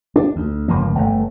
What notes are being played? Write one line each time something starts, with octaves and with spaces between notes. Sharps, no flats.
D4
D2
G1 C#2 F3 A#3
G1 A3